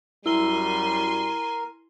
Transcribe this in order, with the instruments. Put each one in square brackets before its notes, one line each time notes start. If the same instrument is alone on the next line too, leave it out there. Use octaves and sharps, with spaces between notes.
[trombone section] F#2 F#3 G3 [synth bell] E4 G7 [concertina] A#4 [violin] G#5 C6